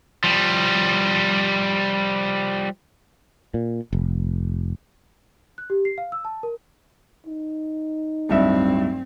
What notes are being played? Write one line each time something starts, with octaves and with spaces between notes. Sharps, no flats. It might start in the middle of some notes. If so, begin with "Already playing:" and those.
F3 G3
A#2
F1
F#6
G4
C7
F5
E6
A5
A#4
D#4
D1 G2 C4 E5